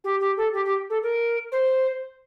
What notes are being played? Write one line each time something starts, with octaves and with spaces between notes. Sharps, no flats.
G4
G4
A4
G4
G4
A4
A#4
C5